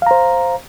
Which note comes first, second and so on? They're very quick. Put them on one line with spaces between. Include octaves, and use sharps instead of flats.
F5 A#5 C5